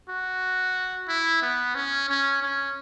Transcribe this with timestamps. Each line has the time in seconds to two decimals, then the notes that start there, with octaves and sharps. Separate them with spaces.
0.09 F#4
1.08 E4
1.42 B3
1.75 C#4
2.09 C#4
2.42 C#4